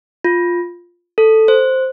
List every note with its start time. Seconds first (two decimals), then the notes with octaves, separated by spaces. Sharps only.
0.24 F4
1.18 A4
1.48 C5